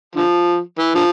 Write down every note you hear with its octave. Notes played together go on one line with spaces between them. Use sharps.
D3 F3
E3
D3 F3